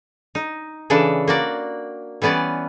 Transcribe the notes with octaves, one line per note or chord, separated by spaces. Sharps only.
D#4
C#3 E3 D4 A4
A#3 F#4 D5
E3 G3 B3 C#4 D5